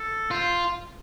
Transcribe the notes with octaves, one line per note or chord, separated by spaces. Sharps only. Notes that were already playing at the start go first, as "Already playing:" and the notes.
Already playing: A4
F4 C5